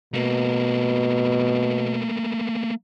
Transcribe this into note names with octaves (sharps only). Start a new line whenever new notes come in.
B2 A3 A#3